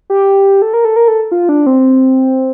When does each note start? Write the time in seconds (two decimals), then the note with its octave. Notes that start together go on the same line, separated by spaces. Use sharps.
0.10 G4
0.62 A4
0.74 A#4
0.85 A4
0.96 A#4
1.08 A4
1.32 F4
1.49 D4
1.66 C4